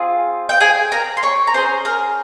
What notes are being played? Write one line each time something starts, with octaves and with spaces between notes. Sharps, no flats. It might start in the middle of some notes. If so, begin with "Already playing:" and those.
Already playing: C4 F4 G#4
G5
G#4 G#5
A#4 A#5
C6
C#5 C#6
A#5
C#4 E4 G#4 C5 C6
A#4 A#5